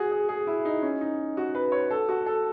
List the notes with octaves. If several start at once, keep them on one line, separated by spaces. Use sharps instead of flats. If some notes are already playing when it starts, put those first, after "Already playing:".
Already playing: F#4 G#4
G#4
G#4
E4
D#4
C#4
D#4
F#4
B4
C#5
A4
F#4
A4